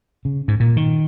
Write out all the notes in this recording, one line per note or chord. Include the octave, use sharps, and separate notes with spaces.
C#3
G#2
A#2
D#3